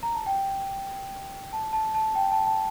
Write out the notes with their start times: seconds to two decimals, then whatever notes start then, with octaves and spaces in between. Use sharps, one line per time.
0.03 A#5
0.15 A5
0.26 G5
1.53 A5
1.73 A5
1.95 A5
2.15 G5
2.32 A5
2.47 A5